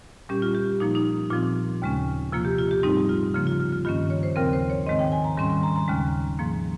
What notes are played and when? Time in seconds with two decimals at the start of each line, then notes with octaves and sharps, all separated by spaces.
0.29 A#2 G3 C#4 G4
0.42 F4
0.55 G4
0.80 A#2 F3 A#3 D#4
0.95 D#4
1.30 A#2 F3 C4 F4
1.82 D#2 C#3 G#3 C#4
2.32 C3 F3 A#3 F4
2.45 G4
2.59 F4
2.71 G4
2.83 G#2 G3 C4 D#4
3.09 F4
3.34 C#3 F3 A#3
3.47 F4
3.60 F4
3.73 F4
3.85 G2 D#3 A#3 C#4 F4
4.10 C#5
4.23 C5
4.36 D#2 C#3 F3 C4 A#4
4.53 C5
4.70 C#5
4.87 G#2 D#3 G#3 C4 D#5
4.99 G5
5.12 G#5
5.24 A#5
5.37 G#2 D#3 G3 C#4 C6
5.50 C6
5.63 A#5
5.76 A#5
5.88 D#2 C#3 G#3 C#4
6.39 G#2 F3 A#3